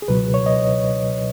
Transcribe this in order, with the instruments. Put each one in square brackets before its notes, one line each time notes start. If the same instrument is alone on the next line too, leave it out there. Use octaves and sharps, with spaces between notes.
[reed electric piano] G#4
C#2 B2 F#3 B4
C#5
D#5